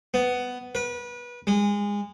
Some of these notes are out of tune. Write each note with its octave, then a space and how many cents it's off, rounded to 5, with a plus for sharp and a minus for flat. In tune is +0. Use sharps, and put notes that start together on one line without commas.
B3 +10
B4 -25
G#3 -25